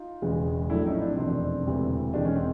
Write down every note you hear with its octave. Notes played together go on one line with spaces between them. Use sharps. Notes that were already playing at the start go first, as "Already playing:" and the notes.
Already playing: D#4 F4
E1 E2 C#3 E3 G#3
A#1 A2 F#3 A3 D4 E4
C#4 D#4
C4 D4
F1 E2 B2 C4 D4
E1 D2 C3 E3
E1 D#2 D#3 G#3 D4
C#4
C4